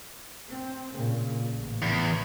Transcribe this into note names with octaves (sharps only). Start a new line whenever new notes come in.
C4
A#2 C#3
A1 C#3
E2